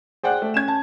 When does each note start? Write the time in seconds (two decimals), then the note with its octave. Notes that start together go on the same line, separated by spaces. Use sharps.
0.23 G#4 C5 D5 F#5 G5 F#6
0.42 A3
0.54 C#4 G#6 E7
0.68 A5